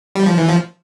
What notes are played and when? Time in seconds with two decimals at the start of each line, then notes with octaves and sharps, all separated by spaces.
0.15 G3
0.26 F3
0.38 E3
0.48 F3